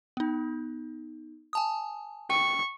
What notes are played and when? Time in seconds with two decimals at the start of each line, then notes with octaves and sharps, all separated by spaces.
0.17 B3 D#4
1.53 G#5 A5 D#6
2.30 G5 C#6